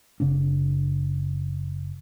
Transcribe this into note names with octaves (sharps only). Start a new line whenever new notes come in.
F#1 C#3 C4 D4